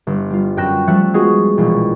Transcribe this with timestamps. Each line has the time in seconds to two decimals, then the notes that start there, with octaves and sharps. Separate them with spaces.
0.07 G1
0.30 G3 F4
0.57 F#2 G5 F#6 A#6 E7
0.88 F3 G3 A3 E5 F#6 C#7
1.14 G#3 B3 F4 F#4 G#4
1.57 E1 A#1